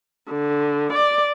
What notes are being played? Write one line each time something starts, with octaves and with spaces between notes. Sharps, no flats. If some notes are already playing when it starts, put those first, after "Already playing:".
D3
D5